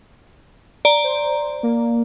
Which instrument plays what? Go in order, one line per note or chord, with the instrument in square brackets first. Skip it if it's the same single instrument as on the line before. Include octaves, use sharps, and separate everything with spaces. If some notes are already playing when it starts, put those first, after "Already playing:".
[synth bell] D5 A#5
[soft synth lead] C5
A#3